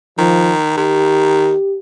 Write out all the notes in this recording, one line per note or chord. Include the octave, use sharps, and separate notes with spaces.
D#3 F3
D#3 G4